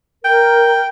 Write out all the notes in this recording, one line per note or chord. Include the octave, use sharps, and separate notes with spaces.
A#4 G5